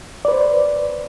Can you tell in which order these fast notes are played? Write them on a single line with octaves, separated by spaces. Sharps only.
D5 B4 C5